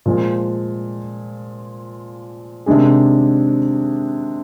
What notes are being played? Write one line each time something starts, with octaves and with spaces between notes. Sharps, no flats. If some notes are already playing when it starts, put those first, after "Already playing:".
A#2 F3 G#3
C3 D#3 G#3 D4 G#4